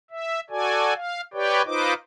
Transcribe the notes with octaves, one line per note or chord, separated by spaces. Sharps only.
E5
F#4 A4 D5 G#5
F5
G4 B4 C#5 D5 G5
D#4 F4 B4 C5 D#5 D6